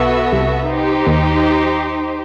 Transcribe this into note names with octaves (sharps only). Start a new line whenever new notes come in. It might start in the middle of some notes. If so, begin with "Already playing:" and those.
Already playing: B1 B2 B3 F#4 A4 E5
C2 C3
D#4 G4 C5
D#2 D#3